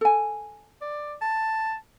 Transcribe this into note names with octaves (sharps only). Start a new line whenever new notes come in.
A4 G#5
D5
A5